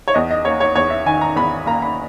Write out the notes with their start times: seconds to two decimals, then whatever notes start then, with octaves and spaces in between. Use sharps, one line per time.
0.08 C#5
0.14 E2 D#5
0.31 D#5
0.45 A#3 C#5
0.60 C#5
0.75 E2 C#5
0.90 E5
1.06 D#3 G#5
1.21 A#5
1.36 E2 B5
1.66 A#3 A#5
1.82 B5